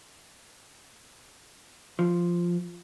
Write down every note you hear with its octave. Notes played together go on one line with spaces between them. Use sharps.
F3